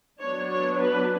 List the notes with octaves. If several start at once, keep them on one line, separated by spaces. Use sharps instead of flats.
F#3 B3 D4 C#5
C#5
B4